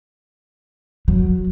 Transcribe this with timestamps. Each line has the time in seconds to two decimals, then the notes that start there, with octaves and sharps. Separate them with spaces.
1.08 F#3